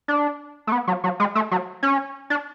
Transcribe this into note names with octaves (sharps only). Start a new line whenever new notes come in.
D4
A3
B3
F#3
F#3
G#3
A3
F#3
C#4
D4